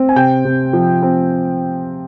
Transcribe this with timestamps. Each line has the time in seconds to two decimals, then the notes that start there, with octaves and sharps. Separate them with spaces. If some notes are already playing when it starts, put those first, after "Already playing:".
Already playing: C4
0.09 G#5
0.16 C3 G5
0.45 C3
0.73 F3
1.02 C4